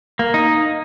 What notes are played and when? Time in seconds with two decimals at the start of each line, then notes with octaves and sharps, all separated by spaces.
0.19 A#3
0.34 D#4